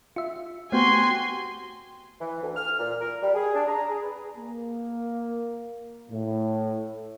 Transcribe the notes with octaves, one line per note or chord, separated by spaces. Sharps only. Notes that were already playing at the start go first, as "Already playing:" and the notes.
F4 E5
A3 B3 C4 F#4 G4 G#5 C6
E3
D2
F6
A#2
A#4
G3
G#4
D4
A#5
G#4
B4
A#3
A2